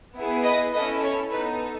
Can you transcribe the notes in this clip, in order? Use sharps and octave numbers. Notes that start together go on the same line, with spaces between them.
B3 E4 G#4
B4 D#5
C#4 E4 A4 B4 D#5
C#5
B3 D#4 A4 B4